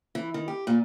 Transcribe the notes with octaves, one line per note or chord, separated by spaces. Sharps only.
E3
D#3
G4
A#2